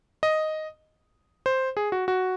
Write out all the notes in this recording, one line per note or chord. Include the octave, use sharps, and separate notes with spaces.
D#5
C5
G#4
F#4
F#4